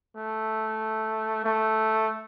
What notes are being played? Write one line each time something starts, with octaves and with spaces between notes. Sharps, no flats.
A3
A3